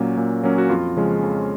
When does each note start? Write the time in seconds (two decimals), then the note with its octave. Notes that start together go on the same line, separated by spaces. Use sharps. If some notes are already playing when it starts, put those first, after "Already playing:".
Already playing: A#2 F#3 A#3 C#4
0.17 A#2
0.43 F#3 A#3 C#4
0.58 F#4
0.70 F2 F4
0.97 C#3 F3 G#3 C#4
1.23 F2